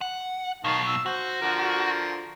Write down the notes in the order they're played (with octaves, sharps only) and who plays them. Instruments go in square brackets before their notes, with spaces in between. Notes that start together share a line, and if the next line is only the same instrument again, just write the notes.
[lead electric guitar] F#5
[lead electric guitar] B2 F#3 [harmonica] D#3 F5 A5
[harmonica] E6
[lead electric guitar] F#4 [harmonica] C5
[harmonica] D3 F3 A#4